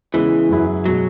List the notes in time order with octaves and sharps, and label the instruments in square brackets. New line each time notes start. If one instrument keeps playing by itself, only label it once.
[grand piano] C#3 G#3 B3 E4 [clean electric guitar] E3
[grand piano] F#2 F#3 E4 G#4
[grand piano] B2 G#3 [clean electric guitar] F#3